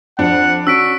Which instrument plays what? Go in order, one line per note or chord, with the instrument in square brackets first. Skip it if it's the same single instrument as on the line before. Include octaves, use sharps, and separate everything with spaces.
[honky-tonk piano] F2 [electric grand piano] D4 [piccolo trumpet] F#5
[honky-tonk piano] C#4 [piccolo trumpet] F#4 [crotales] E6 B6 D7